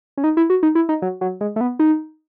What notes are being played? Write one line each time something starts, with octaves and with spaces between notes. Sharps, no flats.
C#4
D#4
E4
F#4
D#4
E4
D#4
F#3
F#3
G#3
A3
B3
D#4